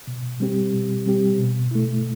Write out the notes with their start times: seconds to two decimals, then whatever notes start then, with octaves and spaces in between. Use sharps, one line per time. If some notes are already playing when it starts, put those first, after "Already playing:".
0.07 B2
0.40 G3 C4 G4
0.73 B2
1.06 G3 C4 G4
1.38 B2
1.71 A3 E4